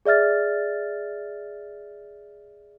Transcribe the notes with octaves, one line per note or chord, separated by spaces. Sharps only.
G#4 D5 E5 F6 A6